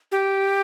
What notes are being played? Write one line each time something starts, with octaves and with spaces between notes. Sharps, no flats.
G4